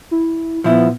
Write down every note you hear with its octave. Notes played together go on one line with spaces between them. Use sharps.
E4
A#2 F3 B3 E4